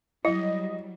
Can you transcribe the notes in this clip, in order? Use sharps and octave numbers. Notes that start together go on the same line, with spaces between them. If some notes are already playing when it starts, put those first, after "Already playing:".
F#3 G3 E4 D#5